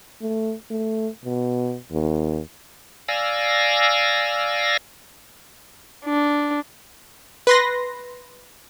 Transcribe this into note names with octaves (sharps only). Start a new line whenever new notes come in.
A3
A3
B2
D#2
D5 F5 G#5 E6 A#6
D4
B4 C6 A#6